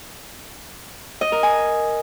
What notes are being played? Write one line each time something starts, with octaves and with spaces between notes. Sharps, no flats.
D#5
A#4
G#5